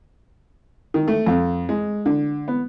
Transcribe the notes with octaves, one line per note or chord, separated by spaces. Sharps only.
D#3
A3
F2
G#3
D3
B3